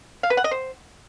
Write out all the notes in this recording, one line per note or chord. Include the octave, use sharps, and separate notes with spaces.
F5
B4
F#5
D#5
C5